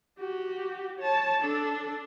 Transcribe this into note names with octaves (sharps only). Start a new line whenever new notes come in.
F#4 G4
C#5 A5
D4 A4